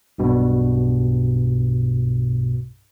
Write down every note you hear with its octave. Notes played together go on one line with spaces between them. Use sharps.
B1 G2 B2